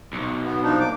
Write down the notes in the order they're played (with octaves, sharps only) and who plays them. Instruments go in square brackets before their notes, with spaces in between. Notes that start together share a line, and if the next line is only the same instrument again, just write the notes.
[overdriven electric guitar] B1
[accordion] B3
F3 D4 D#4
D2 A#3 D6